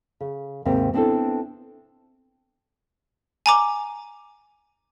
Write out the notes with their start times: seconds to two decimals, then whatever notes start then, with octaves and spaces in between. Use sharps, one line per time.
0.20 C#3
0.65 D#2 G#2 C3 A#3 C4
0.94 B3 C4 D4 E4 A4
3.46 G#5 A#5 D6